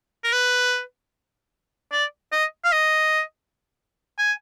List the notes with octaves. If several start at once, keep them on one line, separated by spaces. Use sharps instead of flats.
A#4
B4
D5
D#5
F5
D#5
G#5